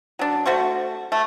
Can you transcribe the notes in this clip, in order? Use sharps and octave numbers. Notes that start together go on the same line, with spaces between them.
F#3 D4
A3 F#4 C5 C#6
A3